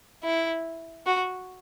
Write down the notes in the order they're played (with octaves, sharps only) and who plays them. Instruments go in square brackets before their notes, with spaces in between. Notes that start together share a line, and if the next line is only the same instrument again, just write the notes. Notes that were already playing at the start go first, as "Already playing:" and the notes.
[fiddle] E4
F#4